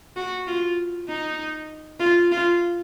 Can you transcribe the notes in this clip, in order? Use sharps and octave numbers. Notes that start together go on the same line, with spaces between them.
F#4
F4
D#4
F4
F4